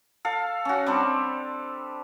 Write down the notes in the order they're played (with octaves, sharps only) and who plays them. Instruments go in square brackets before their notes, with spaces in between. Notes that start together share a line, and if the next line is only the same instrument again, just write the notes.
[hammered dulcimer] A4 F5
C#4 F#4
G3 C4 D4